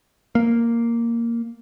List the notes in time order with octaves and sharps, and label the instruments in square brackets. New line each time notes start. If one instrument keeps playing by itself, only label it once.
[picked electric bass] A#3